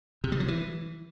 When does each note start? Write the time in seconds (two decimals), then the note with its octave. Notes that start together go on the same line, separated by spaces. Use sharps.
0.24 C3
0.32 G3
0.40 F#3
0.48 E3